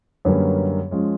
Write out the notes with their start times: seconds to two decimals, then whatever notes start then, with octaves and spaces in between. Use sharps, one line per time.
0.25 F#2 D3 G3 A#3 C#4 B4 C#5
0.91 F3 G#3 C#4